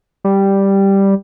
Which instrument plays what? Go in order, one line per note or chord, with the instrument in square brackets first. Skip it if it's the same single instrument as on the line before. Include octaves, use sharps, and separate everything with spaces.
[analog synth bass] G3